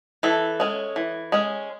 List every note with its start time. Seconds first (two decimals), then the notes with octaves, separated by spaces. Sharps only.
0.23 E3 A4
0.60 G#3 C#4
0.96 E3
1.32 G#3 C#4